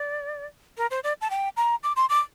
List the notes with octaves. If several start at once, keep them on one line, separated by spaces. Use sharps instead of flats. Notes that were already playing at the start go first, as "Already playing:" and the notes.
Already playing: D5
A#4
C5
D5
A5
G5
A#5
D6
C6
D6